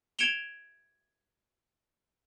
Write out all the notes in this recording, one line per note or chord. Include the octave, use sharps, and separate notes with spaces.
G#6 C#7 D7 E7 F7 G7